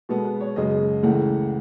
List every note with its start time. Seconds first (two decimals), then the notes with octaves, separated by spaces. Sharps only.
0.09 B2 G#3 B3 A4
0.25 B4
0.41 C#5
0.56 F#2 C#3 G#3 D#5
1.03 C#2 C#3 E3 A3 F#5